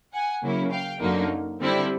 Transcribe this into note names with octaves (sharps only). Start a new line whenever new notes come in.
F#5 G#5
C#3 F#3 A#3 C#4 E4
F5 G5
F#2 D3 F#3 A#3 D#4
D3 G3 C4 E4